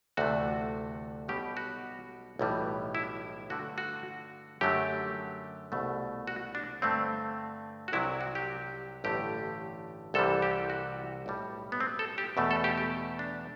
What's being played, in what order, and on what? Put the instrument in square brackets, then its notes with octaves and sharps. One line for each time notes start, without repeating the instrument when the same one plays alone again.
[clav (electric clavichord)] D2 C3 E3 A3 F#4
B1 B2 G3 G4
F#4
B1 A2 E3 G3
E4
G2 D3 A3 F#4
F#4
F#2 D3 F#3 A3 G4
C2 B2 A3
F#4
D4
G2 D3 A3 C4
F#4
C2 C3 F#3 E4
F#4
G4
A1 G2 D3 A3 G4
C2 C3 E3 G3 A4
G4
F#4
B1 A2 G3
B3
C4
A4
G4
E2 B2 A3
A4
G4
G4
D4